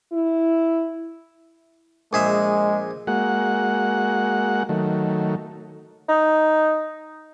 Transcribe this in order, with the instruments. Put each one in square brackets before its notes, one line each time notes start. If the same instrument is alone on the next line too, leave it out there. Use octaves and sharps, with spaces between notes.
[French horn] E4
[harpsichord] A#1 G#4 E5 [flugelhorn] G#3
[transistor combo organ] G#3 A#3 F#4 F#5
D#3 F#3 A3
[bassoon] D#4